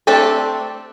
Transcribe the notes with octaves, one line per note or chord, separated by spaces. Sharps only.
A3 C4 D4 G4 A4